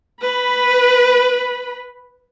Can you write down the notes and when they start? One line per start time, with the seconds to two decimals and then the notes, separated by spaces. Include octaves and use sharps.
0.22 B4 B5